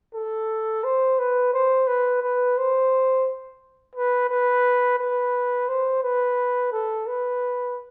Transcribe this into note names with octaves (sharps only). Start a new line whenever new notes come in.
A4
C5
B4
C5
B4
B4
C5
B4
B4
B4
C5
B4
A4
B4